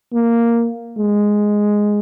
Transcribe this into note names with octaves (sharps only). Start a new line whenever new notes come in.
A#3
G#3